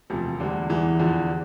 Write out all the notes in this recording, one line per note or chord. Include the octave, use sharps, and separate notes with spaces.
E1 D2 C3 F3
E2 D3 G3
E2 E3 G3
E2 D3 F3